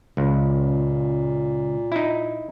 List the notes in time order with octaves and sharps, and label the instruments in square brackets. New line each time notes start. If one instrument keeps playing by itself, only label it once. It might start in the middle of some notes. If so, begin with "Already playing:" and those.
[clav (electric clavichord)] C#2 [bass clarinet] A#2
[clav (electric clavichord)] D#4 E4